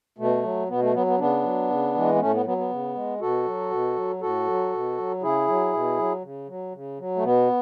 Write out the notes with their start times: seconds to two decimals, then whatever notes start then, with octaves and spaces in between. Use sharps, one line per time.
0.18 B2 A3
0.43 F#3
0.69 B2 B3
0.81 A3
0.94 F#3 B3
1.07 B3
1.19 C#3 B3 D4
1.44 F#3
1.70 C#3
1.95 E3 G#3
2.15 B3
2.20 A2 A3 C#4
2.33 B3
2.45 F#3 B3
2.58 B3
2.70 C#3
2.95 G#3
3.21 B2 F#4 A4
3.46 F#3
3.71 B2
3.96 F#3
4.21 A2 F#4 A4
4.47 F#3
4.72 B2
4.98 F#3
5.22 C#3 E4 G#4
5.47 F#3
5.73 B2
5.98 F#3
6.23 C#3
6.48 F#3
6.73 C#3
6.99 F#3
7.16 A3
7.23 B2 B3